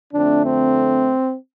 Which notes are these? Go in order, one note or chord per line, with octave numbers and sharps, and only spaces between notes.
F2 D3 A3 C4 D4
C4